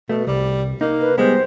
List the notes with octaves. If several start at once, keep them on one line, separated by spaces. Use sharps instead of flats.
B2 A3
C2 G3
A#3 D#4
B4
G3 G#3 B3 C5